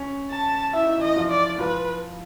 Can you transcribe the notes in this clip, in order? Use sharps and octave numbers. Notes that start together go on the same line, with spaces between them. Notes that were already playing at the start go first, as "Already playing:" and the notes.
Already playing: C#4
A5
E4 E5
D#4
E3 E4 D#5
F3 F4
D5
F3 F4 B4